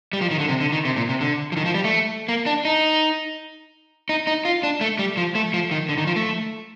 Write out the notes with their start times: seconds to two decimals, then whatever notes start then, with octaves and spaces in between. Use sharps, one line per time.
0.13 G3
0.21 F3
0.31 D#3
0.40 D3
0.49 C3
0.60 D3
0.72 D#3
0.85 C3
0.96 A#2
1.09 C3
1.21 D3
1.52 F3
1.57 D#3
1.65 F3
1.74 G3
1.84 A3
2.28 A#3
2.46 D4
2.65 D#4
4.09 D#4
4.27 D#4
4.45 F4
4.63 D4
4.81 A3
4.99 G3
5.17 F3
5.35 A3
5.53 F3
5.71 D#3
5.89 D3
5.98 D#3
6.07 F3
6.16 A3